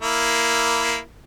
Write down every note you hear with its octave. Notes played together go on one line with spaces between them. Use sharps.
A#3 E4